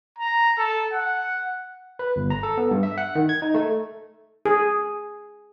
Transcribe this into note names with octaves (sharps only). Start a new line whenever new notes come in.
A#5
A4
F#5
B4
G1
A#5
A4
B3
G2
E5
F#5
D#3
G#6
D#4
A3
G#4